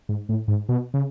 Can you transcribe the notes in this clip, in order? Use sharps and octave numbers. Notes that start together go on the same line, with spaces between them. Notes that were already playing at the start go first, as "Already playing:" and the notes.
G#2
A2
G#2
B2
C#3